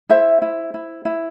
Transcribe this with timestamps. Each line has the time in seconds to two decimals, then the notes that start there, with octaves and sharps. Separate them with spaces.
0.09 E4 C5 E5
0.42 E4
0.74 E4
1.05 E4